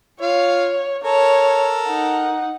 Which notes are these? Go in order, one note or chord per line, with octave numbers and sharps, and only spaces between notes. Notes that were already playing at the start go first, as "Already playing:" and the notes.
F4 C#5 F5
A4 A#4 C#5
D#4 F#5